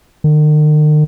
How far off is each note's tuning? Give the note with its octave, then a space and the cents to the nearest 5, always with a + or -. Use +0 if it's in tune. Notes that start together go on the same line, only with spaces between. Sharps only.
D#3 -45